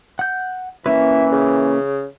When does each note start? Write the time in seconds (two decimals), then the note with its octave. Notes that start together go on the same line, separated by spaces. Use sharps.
0.19 F#5 G6
0.86 E3 A#3 C#4 E4 B4
1.32 C#3